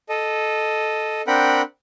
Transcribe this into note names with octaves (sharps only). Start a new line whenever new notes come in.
A4 D#5
C4 D4 A#4 F#5 G5 B5